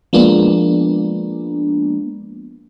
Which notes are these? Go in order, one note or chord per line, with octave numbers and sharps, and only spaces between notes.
F3 G#3 A#3 B3 D4